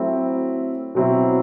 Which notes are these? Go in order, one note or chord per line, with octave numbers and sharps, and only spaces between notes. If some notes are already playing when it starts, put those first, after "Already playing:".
Already playing: F#3 A3 C4 E4
B2 F#3 C4 E4